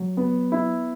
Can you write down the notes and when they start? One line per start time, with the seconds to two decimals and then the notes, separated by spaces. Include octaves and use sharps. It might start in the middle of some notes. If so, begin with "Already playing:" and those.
Already playing: F#3
0.17 B3
0.52 E4